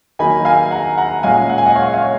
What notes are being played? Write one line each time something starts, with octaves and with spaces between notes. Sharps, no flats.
D#3 F#3 A#3 D#4 G#5 B5
F5 G#5
F#5 A#5
F#5 A#5
A#2 G#3 C#4 F5 G#5
F#5
G#5
D#5 F#5
C#5 F5
C#5 F5